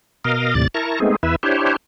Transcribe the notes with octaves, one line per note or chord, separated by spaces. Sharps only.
B2 A#4 D#5 F5
D#2 A2 C3 D5 A6
E4 A#4 A5 A#5 C#6
G#3 A3 B3 C4 D#4 G#4
E2 E4 B4 E5
D4 E4 G4 C5 C#5